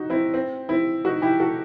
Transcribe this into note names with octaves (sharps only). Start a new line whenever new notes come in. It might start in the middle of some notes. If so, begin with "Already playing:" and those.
Already playing: D#4 F#4
C4 E4
C4
C4 E4
D#4 F#4
E4 G4
F#4 A4